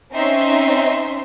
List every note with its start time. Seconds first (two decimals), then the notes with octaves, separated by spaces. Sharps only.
0.13 C4 C#4 D#4 E5 C6